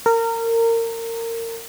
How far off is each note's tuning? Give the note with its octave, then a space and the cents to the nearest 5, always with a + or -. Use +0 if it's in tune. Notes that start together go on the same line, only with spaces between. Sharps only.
A#4 -25